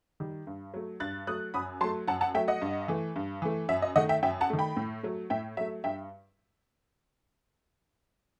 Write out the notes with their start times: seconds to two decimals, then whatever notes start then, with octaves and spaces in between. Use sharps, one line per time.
0.20 D#3 G3
0.47 G2
0.74 F#3 A3
1.00 G2 F#6 A6
1.27 F#3 A3 D#6 F#6
1.54 F#2 B5 D#6
1.81 F#3 A3 A5 C6
2.08 F#2 F#5 A5
2.21 F#5 A5
2.34 F#3 A3 E5 G5
2.48 D#5 F#5
2.62 G2
2.88 E3 A3
3.16 G2
3.42 E3 A3
3.69 F#2 E5
3.82 D#5
3.96 D#3 A3 D#5 F#5
4.09 E5 G5
4.23 F#2 E5 G5
4.41 F#5 A5
4.50 D#3 A3
4.59 G5 B5
4.77 A2
5.03 F#3 A3
5.30 A2 E5 G5
5.57 F#3 A3 E5
5.84 G2 E5 G5